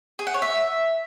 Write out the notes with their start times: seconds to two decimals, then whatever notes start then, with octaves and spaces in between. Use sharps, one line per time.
0.19 G#4
0.27 F#5
0.34 C#5
0.42 E5